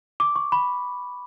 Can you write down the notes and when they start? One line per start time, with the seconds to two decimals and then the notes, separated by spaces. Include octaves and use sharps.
0.20 D6
0.36 C#6
0.52 B5